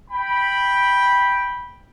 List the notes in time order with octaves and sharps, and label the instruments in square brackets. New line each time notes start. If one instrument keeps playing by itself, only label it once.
[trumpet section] G5 B5